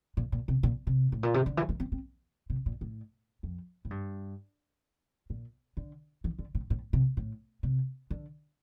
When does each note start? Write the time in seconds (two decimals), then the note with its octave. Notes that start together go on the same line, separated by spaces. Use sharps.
0.17 A#2
0.32 A#2
0.48 C3
0.63 A#2
0.87 C3
1.12 A2
1.23 A#2
1.34 C3
1.46 D3
1.57 E3
1.69 A3
1.80 C4
1.92 C4
2.50 C3
2.66 A#2
2.81 A2
3.43 F2
3.85 A2
3.90 G2
5.30 A#2
5.77 D3
6.24 E3
6.39 D3
6.55 A2
6.70 A2
6.93 C3
7.17 A2
7.63 C3
8.10 D3